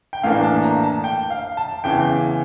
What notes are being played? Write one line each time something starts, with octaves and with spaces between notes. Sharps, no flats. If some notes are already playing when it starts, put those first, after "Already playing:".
G5
A2 E3 A#3 D4 F5
A5
A#5
A5
G5
F5
A5
E2 C#3 E3 G5